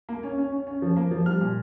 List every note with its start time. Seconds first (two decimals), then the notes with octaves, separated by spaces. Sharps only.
0.09 A#3
0.23 C#4
0.38 C#4
0.52 C#4
0.67 C#4
0.82 F3
0.97 A#3
1.11 F3
1.26 G3 F6
1.41 A#2